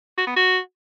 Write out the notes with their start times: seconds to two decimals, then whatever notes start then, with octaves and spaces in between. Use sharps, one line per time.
0.18 F#4
0.27 B3
0.36 F#4